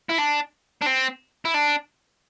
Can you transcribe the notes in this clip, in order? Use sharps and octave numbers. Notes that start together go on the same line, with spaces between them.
E4
D4
D4
C4
E4
D4